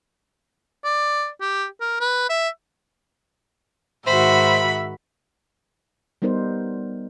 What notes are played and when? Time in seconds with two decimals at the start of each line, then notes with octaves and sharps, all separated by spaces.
0.85 D5
1.41 G4
1.81 A#4
2.00 B4
2.30 E5
4.07 G#2 D#3 F#4 C5 E5 B5
6.22 G3 B3 D#4 A#4 C5